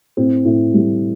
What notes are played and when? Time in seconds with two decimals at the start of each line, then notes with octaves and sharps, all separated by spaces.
0.17 A2 C4
0.45 A2
0.74 G3